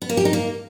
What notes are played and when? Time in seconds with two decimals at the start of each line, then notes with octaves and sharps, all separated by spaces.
0.02 B3
0.09 A#3
0.17 G4
0.25 D#4
0.33 A#3